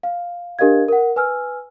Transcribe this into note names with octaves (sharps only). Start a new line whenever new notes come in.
F5
D4 G4 A#4 D#5 F5 G#6
A#4 F#5
B4 G#5 E6 F6